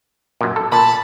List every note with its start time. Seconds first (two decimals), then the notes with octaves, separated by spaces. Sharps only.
0.41 F#2 A#2
0.56 A4
0.72 A#2 A5 B5